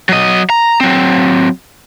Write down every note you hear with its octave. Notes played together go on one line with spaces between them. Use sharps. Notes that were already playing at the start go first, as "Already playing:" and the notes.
F#3 D#5
A#5
F#3 C4